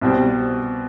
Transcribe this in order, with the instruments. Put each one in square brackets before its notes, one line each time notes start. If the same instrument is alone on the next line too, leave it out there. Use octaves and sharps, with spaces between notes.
[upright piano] C2 B2 G3 C4